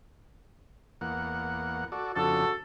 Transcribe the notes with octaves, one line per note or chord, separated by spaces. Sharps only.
E2 A#3 F#5
F#4 A4 D5
F2 C#3 D4 F#4 A4